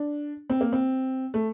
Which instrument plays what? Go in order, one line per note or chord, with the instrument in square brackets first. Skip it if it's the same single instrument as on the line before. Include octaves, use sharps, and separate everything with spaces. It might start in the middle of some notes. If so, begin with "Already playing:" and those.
Already playing: [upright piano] D4
C4
A#3
C4
A3